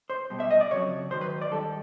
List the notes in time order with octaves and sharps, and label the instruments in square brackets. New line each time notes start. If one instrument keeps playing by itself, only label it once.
[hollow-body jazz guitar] C5
B2 G3
E5
D#5
D5
F2 C#3 F#3 C#5
G#2 D#3 F#3 C5
B4
D5
G#2 D#3 G3 A4